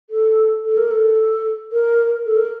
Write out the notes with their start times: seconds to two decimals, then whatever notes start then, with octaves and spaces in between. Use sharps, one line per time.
0.10 A4
0.65 A4
0.77 A#4
0.91 A4
1.72 A#4
2.26 A4
2.36 A#4